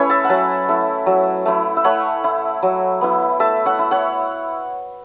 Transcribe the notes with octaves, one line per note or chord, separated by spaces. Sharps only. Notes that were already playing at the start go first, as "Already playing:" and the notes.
Already playing: A3 C#4 E4 B4 C#5
E5 A5
F#5
F#3 E5 A5
A3 E4
F#3
A3 E4
E5
A3 C#5 F#5
E4
F#3
B3 E4
A3 E5 A5
C#5 F#5
E4
C#5 F#5